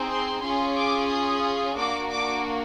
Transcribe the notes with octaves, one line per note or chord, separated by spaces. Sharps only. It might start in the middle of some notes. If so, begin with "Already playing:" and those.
Already playing: C4 D#4 G#4
C6
C#4 F4 G#4 C6
D6
D#6
A#3 D4 F#4 D6
D6